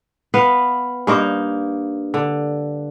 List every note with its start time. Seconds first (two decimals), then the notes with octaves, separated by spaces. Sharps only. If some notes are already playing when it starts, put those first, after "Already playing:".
0.34 B3 B4 F5
1.07 G2 A#3 D#4 C5
2.14 D3